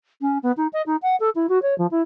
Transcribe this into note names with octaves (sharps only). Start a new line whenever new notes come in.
C#4
B3
D#4
D#5
D#4
F#5
A4
E4
F#4
C#5
F3
E4